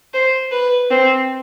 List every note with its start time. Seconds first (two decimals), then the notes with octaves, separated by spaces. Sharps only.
0.14 C5
0.51 B4
0.91 C4